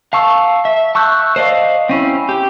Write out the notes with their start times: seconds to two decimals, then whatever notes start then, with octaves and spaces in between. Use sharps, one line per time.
0.13 F5 A5 C#6 E6
0.65 E5
0.95 A5 C#6 E6 F#6 G6
1.36 C5 D5 D#5 F5
1.89 C4 C#4 E4
2.29 G4